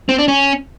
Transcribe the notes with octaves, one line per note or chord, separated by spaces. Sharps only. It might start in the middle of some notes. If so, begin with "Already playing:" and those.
C4
D4
C#4